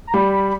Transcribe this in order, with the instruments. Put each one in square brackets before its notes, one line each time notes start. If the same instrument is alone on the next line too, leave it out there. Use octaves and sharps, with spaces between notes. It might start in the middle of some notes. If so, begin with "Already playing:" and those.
[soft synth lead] A#5
[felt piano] G3 [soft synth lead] B5